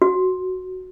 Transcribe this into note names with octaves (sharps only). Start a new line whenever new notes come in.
F#4